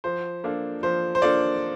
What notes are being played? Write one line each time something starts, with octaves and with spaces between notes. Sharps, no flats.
F3 C5
A#3 D4 F4 A4
F3 C5
C5
A#3 D4 F4 A4 D5